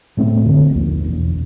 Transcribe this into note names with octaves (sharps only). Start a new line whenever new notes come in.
A2 A3 C4
F#2 D3
A#1 D#2
E1